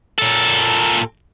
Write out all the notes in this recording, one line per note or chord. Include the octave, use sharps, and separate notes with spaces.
A#2 A4